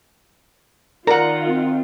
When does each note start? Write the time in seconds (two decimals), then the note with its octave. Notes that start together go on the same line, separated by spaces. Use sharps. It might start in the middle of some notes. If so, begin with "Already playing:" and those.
1.07 D#3 F4 A#4 D5 F#5 A#5
1.47 C4